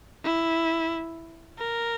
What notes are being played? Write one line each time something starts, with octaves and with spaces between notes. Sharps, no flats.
E4
A#4